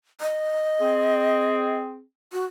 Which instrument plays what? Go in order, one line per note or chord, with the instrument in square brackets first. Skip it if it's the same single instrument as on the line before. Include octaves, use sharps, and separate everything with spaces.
[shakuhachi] D#5
[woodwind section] C4 G#4
[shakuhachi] F#4